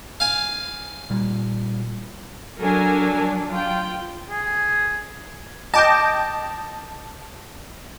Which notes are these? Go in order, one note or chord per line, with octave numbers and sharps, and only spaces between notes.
F5 G#5
A#2 G3
F#3 D4 A4 A#4 G#5
F4 G5
G#4
D#5 G5 A5 D6 G6